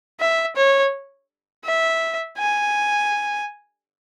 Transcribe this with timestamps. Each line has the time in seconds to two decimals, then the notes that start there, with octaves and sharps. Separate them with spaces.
0.20 E5
0.56 C#5
1.65 E5
2.38 G#5